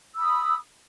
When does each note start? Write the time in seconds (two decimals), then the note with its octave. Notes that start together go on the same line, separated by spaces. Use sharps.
0.14 E6
0.18 B5
0.22 D#6